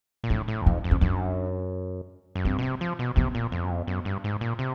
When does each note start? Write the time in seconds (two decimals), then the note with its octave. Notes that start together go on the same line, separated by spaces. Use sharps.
0.24 A#2
0.30 A2 D4
0.48 A2
0.61 E2
0.66 F2 D#4
0.84 F2
0.91 C#4
1.01 F#2 D4
2.36 F#2
2.45 G2 C4
2.59 B2
2.63 C3
2.81 F3
2.99 B2
3.16 C3 B3
3.35 A#2
3.52 F2
3.65 F#2
3.70 F2
3.87 F#2
4.05 G2
4.24 G#2
4.41 A#2
4.59 C3